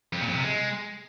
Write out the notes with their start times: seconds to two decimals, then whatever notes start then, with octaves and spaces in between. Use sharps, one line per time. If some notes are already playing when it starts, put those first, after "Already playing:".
0.13 F2
0.20 A#2
0.28 F2
0.35 C3
0.43 G#3